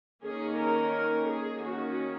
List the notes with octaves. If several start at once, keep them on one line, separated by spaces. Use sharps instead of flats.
D#3 A#3 C#4 G#4
A#4
G#4
D#3 A#3 C#4 F#4